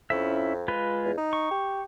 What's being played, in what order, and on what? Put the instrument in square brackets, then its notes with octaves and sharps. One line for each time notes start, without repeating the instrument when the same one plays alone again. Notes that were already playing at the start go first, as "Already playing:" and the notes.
[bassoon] F2 [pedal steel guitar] C#4 E4 E5
[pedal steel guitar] G#3 F4 B4
[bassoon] E2
D#4
[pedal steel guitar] C#6
[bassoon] G4